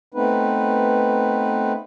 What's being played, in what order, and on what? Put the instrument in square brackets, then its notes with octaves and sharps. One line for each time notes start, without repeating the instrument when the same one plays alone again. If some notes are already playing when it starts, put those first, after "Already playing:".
[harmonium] A3 B3 C4 D#4 B4